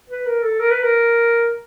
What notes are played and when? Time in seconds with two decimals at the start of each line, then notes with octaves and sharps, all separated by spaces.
0.10 B4
0.26 A#4
0.43 A4
0.60 A#4
0.71 B4
0.83 A#4